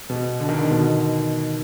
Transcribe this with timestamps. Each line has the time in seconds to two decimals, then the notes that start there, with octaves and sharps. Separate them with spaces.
0.10 B2
0.40 D3
0.49 D#3
0.58 D3
0.71 B2